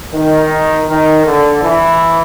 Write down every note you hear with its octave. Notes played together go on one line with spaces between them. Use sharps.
D#3
D#3
D3
E3